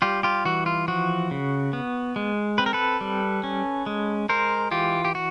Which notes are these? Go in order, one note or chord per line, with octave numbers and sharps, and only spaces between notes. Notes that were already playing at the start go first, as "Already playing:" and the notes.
G3 F4 G4
F4 G4
E3 F#4
F4
F3 F#4
C#3
B3
G#3
C4 B4
A#4
A4 B4
G3
C#4
G#3
G#3 A#4 C5
E3 F4 G4
G4
F#4